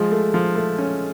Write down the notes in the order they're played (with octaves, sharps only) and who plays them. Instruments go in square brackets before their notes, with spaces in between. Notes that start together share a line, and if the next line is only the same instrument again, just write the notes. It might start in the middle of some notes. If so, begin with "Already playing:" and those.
Already playing: [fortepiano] F3 [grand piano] G#3
[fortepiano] A3
F3
A3
C#4